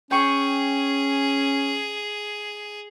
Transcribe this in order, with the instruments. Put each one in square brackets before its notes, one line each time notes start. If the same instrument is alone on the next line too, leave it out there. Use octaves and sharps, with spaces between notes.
[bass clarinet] C#4 [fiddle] G#4 [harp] G5 C#6